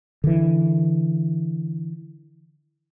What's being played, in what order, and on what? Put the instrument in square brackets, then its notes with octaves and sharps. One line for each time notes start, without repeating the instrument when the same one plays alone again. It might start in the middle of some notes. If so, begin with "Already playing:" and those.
[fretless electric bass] D3 E3